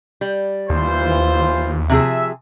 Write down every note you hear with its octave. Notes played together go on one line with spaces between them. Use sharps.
G3
D#2 E3 F4 C5
C3 F3 G#4 E5